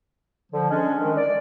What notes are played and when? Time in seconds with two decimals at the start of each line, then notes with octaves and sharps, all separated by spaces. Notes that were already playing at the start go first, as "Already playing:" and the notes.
0.52 D3 F3
0.70 G#3 C#4 D4
1.01 D#3 G#3
1.17 D5